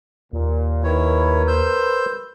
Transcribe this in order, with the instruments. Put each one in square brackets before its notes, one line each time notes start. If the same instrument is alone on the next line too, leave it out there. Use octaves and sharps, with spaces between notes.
[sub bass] D#2 [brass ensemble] A#2
[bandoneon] D#3 E4 C#5 [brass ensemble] A#4 B4
[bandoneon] C5 E6 G6